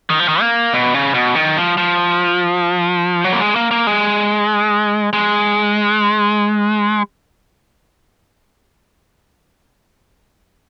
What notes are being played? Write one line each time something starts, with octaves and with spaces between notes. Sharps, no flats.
D#3
F3
D#3
A#3
B2
C#3
B2
D#3
F3
F3
F#3
A#3
G#3
A#3
A#3
G#3
G#3